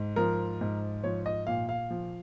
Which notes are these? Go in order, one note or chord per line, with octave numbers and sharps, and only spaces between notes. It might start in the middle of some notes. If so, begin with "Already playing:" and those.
Already playing: G#2
F3 A#4
G#2
F3 C#5
D#5
A#2 F5
F5
F3